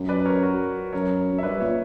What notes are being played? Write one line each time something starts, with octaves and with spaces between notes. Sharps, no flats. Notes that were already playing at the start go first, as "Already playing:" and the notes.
Already playing: F#2
B4 D5
A#4 C#5
F#4 A#4
F#2 A#4 C#5
F#2
E5
G2 B4 D5
A#2 C#5 E5